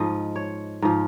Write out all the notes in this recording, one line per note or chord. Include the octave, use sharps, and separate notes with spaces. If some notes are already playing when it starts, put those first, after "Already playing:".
Already playing: G#2 F3 D#5
C#5
G#2 F3